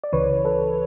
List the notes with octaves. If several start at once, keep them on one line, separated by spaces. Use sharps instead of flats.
D5
C#2 C#3 E3 B4 C#5
A4 B4